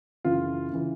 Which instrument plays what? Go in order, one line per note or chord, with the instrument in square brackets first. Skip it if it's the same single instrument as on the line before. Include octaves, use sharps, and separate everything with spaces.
[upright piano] F#2 C#3 E3 F4
C#3 E3